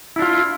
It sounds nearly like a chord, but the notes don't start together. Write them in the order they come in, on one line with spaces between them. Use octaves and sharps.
E4 D4 F4